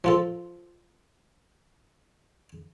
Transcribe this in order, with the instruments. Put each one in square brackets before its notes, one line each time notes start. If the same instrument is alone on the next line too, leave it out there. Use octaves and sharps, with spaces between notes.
[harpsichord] F3 F4 A4